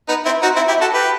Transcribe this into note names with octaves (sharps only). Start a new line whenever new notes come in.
B3 D#4
C4 E4
D#4 F#4
C4 E4
E4 G4
F#4 A4
G4 B4